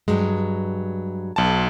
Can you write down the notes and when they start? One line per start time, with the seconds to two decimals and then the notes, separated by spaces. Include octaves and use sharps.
0.08 G2 F#3 G#3
1.36 B1 A5